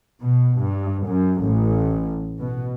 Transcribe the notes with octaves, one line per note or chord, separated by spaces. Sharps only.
B2
G2
F#2
A1
B2